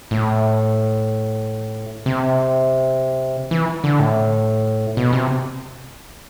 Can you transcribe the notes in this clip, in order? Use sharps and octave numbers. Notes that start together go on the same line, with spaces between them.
A2
C3
E3
D3
A2
B2
C3